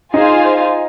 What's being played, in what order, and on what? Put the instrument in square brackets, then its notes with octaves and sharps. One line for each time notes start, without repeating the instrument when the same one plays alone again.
[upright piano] D#4 [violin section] F4 G#4 C5 F5 G#5